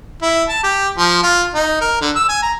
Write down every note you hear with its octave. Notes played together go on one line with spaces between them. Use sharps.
E4
A5
G4
F3
F4
D#4
A#4
D3
E6
G#5
A#5